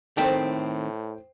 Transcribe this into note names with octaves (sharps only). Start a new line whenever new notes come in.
A2 D#3 A3 C4 C5 G5